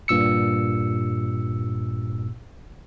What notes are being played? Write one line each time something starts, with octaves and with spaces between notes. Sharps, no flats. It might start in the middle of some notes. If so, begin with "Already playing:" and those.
G2 A#2 E6 C#7